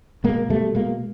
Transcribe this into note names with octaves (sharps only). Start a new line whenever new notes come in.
B2 G#3 A#3
B2 G3 A3
B2 G#3 A#3